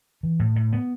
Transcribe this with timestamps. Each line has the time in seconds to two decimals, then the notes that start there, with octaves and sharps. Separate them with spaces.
0.23 E3
0.39 A2
0.56 A2
0.73 B3